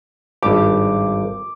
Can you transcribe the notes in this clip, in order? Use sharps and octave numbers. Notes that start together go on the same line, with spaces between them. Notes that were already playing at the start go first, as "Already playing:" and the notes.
G#1 G2 G4 D6